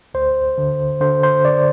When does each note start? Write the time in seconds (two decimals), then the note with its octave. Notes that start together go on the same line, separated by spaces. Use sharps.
0.14 D2 C5
0.58 D3
1.00 D3 C5
1.23 C5
1.44 D3 D5